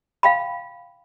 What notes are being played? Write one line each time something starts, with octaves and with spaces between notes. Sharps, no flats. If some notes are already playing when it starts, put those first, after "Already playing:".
F5 G5 B5